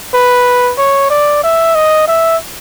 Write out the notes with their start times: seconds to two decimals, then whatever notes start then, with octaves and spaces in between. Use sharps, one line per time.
0.14 B4
0.78 C#5
1.10 D5
1.43 E5
1.75 D#5
2.08 E5